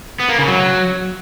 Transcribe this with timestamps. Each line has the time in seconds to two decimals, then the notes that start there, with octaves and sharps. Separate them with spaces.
0.20 B3
0.29 A#3
0.38 C#3
0.48 F#3